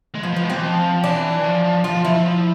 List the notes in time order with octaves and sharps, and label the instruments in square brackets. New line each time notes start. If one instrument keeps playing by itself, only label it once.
[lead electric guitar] G#3
[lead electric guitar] F3 [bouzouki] B3
[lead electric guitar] F3 [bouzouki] B3
[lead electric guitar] G#3
[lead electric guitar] E3 F3 [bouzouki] C4
[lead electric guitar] F3
[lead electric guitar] E3 [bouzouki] D4
[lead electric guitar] F3
F3
[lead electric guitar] F3 [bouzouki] F4
[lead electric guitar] F3
[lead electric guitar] F3 [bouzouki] E4
[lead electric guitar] F3